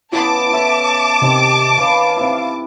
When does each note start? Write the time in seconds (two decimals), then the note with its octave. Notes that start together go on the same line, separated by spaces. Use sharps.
0.12 C#3 B3 E4 A5 D6
0.53 A4 C#5 E5
1.22 C3 D#3 C4
1.78 B4 C#5 F5
2.17 C3 E4